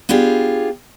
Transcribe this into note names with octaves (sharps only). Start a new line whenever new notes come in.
B3 D4 F4 G4 G#4